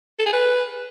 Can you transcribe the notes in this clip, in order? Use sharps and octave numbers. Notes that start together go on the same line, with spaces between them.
A4
G#4
B4